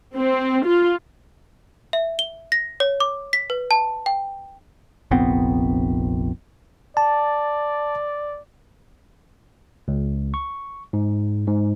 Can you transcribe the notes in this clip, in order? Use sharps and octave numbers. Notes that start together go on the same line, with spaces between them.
C4
F4
E5
G7
A#6
C#5
D6
B6
B4
A5
G5
F1 A#1 B3 C4
D5 A5
C#2
C#6
G#2
G#2